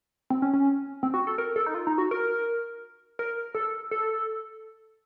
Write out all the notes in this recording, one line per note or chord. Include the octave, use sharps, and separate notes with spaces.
C4
C#4
C#4
C4
F#4
A4
A#4
A4
D#4
F4
D#4
F#4
A#4
A#4
A4
A4